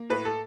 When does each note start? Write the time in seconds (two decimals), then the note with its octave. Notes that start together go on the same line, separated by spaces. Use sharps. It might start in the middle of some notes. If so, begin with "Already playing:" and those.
Already playing: A#3
0.10 A2 B4
0.25 A4